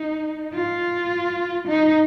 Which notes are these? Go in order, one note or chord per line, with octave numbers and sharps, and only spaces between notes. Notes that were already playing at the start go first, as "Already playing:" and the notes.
Already playing: D#4
F4
D#4